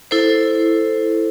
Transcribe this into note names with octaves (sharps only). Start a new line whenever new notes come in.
E4 A4 C5